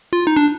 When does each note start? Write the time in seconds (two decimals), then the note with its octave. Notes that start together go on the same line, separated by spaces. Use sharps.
0.13 F4
0.27 D#4
0.37 D4